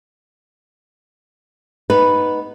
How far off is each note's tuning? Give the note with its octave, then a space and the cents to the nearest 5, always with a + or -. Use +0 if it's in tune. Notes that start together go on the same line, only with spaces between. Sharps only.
B3 +0 D#4 +0 B4 +0